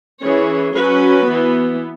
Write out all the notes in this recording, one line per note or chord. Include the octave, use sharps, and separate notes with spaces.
E3 C#4 G#4 C#5
F#3 C#4 F#4 B4
E3 B3